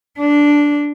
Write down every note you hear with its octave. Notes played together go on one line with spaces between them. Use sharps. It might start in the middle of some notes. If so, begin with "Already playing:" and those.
D4